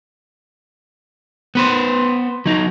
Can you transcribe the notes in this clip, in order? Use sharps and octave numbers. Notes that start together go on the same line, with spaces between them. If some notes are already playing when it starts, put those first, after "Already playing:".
B3 B4 C5
F#3 D#4